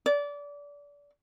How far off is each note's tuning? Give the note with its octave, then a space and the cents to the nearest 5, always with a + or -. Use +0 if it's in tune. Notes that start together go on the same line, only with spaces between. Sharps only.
D5 -25